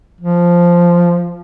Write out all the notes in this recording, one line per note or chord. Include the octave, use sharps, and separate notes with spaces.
F3